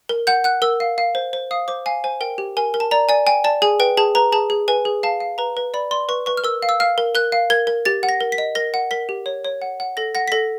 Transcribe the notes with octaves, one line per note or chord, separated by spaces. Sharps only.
A#4
F#5 G6
F#5 F#6
A#4 E6
F5
F5
C5
C5
F5 D#6
C5 D6
F5 G#5
C5 G#5
A#4 G5
G4
A#4 G#5
A#4
A5
D5 A#5
D5 G#5
G5 G#5
D5 A5
G#4 G#5
B4 G5
G#4 A5
B4 A#5
G#4 A5
G#4
B4 G#5
G#4
F5 A5
F5
B4 A#5
B4
D5 B5
D5 C6
B4 C#6
B4 C#6
F6
A#4 E6
F5
E6
F5 F6
A#4
A#4 F#6
F5
A#4 G#6
A#4
G4 A6
F#5
A#6
A#4
B6
D#5
A#4 A#6
F#5
A#4 B6
G4
C#5
C#5
F#5
F#5
A4 A#6
F#5 A#6
B6
A4 A#6